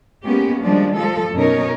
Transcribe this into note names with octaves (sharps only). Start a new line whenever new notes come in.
G#3 A#3 B3 C#4 G4
D#3 F3 G3 G#3 D4
F3 A4
F#2 B2 C#4 D#4 A#4 C#5